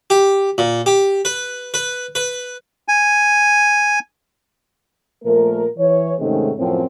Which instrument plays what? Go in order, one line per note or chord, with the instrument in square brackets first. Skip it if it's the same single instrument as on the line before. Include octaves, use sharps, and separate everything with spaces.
[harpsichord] G4
A#2
G4
B4
B4
B4
[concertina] G#5
[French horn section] A#2 F3 A3 A#4
E3 C#5
G#2 C3 D#3 G#3 A3 C#4
F#2 A2 F3 C4